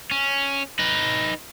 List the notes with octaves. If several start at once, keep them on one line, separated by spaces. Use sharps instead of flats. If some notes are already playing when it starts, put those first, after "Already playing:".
C#4
D#4 B4